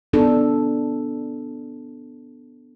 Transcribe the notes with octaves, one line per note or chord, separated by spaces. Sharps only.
B3 D4 A4